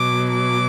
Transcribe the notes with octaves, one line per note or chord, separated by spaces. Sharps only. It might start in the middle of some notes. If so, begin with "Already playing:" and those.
Already playing: B2 F#3 D6
D6